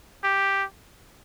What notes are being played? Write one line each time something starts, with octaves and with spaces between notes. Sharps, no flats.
G4